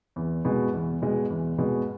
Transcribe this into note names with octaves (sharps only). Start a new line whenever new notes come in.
E2
B2 G#3
E2
B2 G#3
E2
B2 G#3